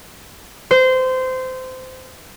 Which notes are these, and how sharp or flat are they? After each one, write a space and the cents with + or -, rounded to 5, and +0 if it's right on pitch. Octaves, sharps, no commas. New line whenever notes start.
C5 -20